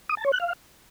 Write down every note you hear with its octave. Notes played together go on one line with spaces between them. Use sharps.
D#6
A5
C#5
F#6
F5